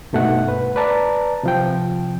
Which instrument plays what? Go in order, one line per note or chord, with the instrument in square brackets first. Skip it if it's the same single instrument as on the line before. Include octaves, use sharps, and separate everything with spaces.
[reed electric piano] G2 B2 A3 D#4 F#5
B4
B4 D5 A5 A#5
C3 F3 G5